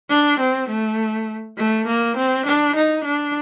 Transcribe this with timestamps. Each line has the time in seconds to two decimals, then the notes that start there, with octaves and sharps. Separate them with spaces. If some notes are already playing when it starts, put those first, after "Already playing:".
0.09 D4
0.39 C4
0.69 A3
1.57 A3
1.87 A#3
2.17 C4
2.46 D4
2.75 D#4
3.04 D4